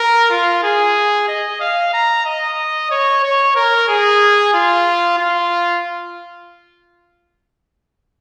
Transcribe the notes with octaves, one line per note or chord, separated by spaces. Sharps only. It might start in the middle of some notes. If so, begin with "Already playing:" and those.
Already playing: A#4
F4
G#4
D#5
F5
A#5
D#5
C#5
C#5
A#4
G#4
F4
F4